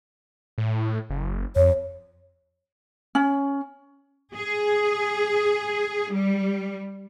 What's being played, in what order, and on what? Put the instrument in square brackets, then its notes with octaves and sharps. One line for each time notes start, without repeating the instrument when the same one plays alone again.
[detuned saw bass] A2
F#1
[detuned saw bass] F2 [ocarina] C#5
[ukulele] C#4
[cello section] G#4
G3